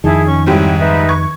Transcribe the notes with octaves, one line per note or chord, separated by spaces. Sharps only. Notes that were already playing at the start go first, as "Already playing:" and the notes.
F2 D#3 E4 G#4 A5
C#4 C#6
G#2 G3 C4 E4 C#5 G5
D#4 B4 E5
C#6 G#6